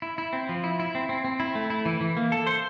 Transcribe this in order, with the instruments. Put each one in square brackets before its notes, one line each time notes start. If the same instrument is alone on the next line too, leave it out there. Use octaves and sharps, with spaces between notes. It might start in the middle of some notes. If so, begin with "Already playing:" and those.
[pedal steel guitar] E4
E4
C4
F3
E4
E4
C4
C4
C4
E4
A3
E4
E3
E3
A#3
A4
C5